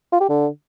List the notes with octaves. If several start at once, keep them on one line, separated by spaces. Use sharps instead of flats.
F4
G4
D3